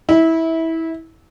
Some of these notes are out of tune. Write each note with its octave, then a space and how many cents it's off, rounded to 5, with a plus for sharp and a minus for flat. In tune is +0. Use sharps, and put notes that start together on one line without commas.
E4 -20